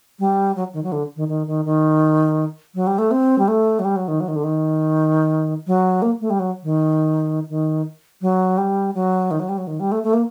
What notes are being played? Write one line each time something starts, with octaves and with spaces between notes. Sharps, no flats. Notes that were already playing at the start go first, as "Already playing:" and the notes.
G3
F#3
D#3
F#3
D3
D#3
D#3
D#3
D#3
F#3
G3
A3
C4
G3
A3
F#3
G3
F#3
D#3
F#3
D#3
D3
D#3
F#3
A#3
A3
G3
F#3
D#3
D#3
F#3
G3
F#3
D#3
F#3
G3
F#3
D#3
G3
A3
A3
A#3